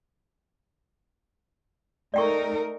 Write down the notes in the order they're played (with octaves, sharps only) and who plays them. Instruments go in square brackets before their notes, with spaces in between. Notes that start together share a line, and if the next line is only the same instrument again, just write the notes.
[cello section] A3 D#4 A#4 [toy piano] D5 G5 C#6